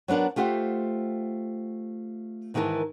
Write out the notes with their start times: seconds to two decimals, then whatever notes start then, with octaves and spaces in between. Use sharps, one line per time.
0.08 F#3 B3 D4 A#4 F#5
0.36 A3 F4 G4 C5 F#5
2.54 G#2 D#3 E3 F#4 A#4 A5